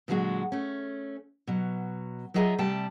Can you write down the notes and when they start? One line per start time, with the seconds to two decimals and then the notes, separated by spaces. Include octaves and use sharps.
0.08 A#2 D3 F#3 G#3 F#4
0.52 A3 C#4
1.47 B2 F#3
2.34 F#3 F4 G#4 D#5 E5 A#5
2.59 C3 G3 A3 G5 A5